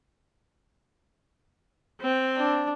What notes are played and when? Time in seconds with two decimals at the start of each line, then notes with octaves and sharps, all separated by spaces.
2.01 C4
2.37 D4